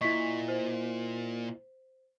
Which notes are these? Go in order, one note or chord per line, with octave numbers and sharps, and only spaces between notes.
A#2 E4 D#5 C#6 B6
C5